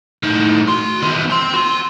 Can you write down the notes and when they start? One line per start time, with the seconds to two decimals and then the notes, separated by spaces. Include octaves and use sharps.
0.24 A2 D#3
0.69 F#4 C6
1.03 D#3 B3
1.30 G5 C6
1.54 F#4 C6